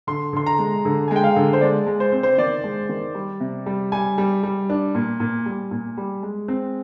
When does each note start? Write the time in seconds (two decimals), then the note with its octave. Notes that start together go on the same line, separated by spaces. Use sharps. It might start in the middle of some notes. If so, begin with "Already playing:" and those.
0.07 D3 C6
0.33 D3 C6
0.46 A#5
0.59 G#3
0.85 D3
1.08 G#5
1.11 G#3
1.16 G5
1.24 F5
1.36 D3
1.53 C5
1.61 G#3 D5
1.87 G#3
2.00 C5
2.12 C4
2.23 C5
2.38 D#3 D5
2.64 G#3
2.89 D#3
3.15 G3
3.40 C3
3.66 G3
3.92 G3 G#5
4.18 G3
4.43 G3
4.70 D4
4.95 A#2
5.20 A#2
5.46 G3
5.71 A#2
5.97 G3
6.23 G#3
6.48 C4